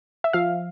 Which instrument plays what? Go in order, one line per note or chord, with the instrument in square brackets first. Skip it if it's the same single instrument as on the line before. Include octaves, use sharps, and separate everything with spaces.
[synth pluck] E5
F3 F5